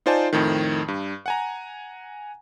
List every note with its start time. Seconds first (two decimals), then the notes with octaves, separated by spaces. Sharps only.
0.06 D#4 F4 C5 D5 G#5 A5
0.33 F2 A2 D#3
0.88 G2
1.26 F#5 G#5 A#5